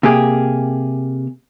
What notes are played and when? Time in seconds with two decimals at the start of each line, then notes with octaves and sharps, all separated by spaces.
0.03 C3 A#3 G4 G#4